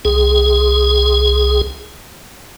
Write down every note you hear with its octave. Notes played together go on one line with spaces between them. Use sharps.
C2 G#4